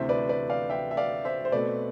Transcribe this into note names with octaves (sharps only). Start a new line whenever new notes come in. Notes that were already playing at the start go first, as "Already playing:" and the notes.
Already playing: D2 C3 E3 C5 E5
B4 D5
B4 D5
D5 F5
E5 G5
E5
D5 F5
C5 E5
C5
B2 A3 C4 B4 D5